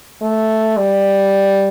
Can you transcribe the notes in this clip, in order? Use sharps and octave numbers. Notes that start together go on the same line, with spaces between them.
A3
G3